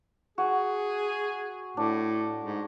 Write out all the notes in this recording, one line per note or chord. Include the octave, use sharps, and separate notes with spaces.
F#4 G#4
A2 D4
G#2